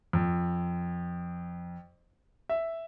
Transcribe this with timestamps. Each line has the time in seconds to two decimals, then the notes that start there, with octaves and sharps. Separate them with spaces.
0.13 F2
2.49 E5